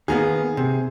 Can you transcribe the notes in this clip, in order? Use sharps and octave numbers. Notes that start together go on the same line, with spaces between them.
D#3 A#3 B3 G#4
C3